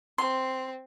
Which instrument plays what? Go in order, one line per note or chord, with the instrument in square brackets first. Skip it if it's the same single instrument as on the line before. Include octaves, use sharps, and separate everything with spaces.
[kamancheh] C4 [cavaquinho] C6